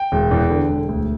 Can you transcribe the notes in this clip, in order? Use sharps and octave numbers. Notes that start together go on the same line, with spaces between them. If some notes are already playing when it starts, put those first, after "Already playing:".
Already playing: G5
E1
E2
D3
E1
D2